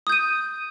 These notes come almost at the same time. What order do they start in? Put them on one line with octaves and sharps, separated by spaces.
D#6 G6 D#7